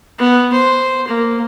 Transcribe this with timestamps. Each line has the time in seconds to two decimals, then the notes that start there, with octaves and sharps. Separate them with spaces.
0.19 B3
0.53 C5
1.07 A#3